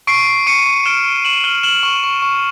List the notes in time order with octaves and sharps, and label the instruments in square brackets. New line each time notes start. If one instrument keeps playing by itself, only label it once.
[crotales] C#6 C7 D7
C#6
C#6 C#7 D#7
C#6
F6 D7 E7
C#6
C#6 E7 F#7
F6
F6 E7 F#7
C#6
C#6
C#6